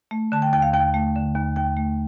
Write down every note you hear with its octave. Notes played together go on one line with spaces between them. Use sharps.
A3
D3 A5
G5
D#2 G5
F5
D#2 G5
A3
D3
D#2
D#2 G5
A3